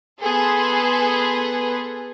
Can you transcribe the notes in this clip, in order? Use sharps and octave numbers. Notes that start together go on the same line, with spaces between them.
B3 G#4 A4 B4 C6